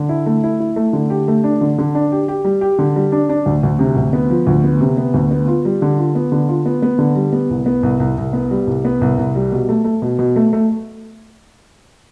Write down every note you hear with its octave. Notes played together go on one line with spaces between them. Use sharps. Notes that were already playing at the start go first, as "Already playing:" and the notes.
Already playing: D3
E4
A3
E4
E4
A3
D3
G4
A3
D4
D3
D3
D4
G4
G4
G3
G4
D3
G3
D4
D4
D2
D2
C3
D2
B3
F3
D2
B3
C3
B3
D2
B3
F4
G3
D3
F4
B3
D3
F4
B3
B3
D3
G3
B3
C2
B3
C2
C2
C2
B3
G3
C2
B3
C2
C2
G3
B2
A3
A3
B2
B2
A3
A3